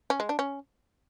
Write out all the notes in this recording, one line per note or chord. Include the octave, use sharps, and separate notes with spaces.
C#4
G#3
D4
C#4